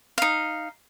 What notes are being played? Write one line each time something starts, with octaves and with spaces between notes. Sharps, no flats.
D#4 F5